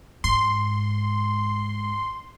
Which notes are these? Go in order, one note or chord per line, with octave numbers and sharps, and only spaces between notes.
G#2 C6